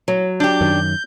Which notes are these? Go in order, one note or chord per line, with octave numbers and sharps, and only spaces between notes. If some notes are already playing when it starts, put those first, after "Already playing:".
F#3
D4 G4 G6
F#2 D#3